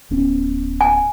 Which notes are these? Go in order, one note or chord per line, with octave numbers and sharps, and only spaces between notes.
D1 B3 C#4
G#5